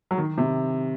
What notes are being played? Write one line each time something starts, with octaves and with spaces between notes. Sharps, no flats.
F#3
D#3
C3